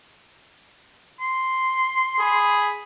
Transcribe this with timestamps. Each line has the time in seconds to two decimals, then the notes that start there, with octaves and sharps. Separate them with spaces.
1.20 C6
2.19 G#4 B5